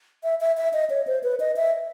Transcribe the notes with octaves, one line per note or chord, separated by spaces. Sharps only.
E5
E5
E5
D#5
C#5
C5
B4
D#5
E5